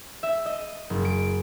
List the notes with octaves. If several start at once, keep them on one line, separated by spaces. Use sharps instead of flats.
E5
D#5
F#1
D7